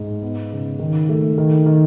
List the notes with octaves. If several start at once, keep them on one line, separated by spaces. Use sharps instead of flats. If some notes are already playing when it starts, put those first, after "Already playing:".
Already playing: G#2
B3
C#3
D#3
A3
D#3
D#3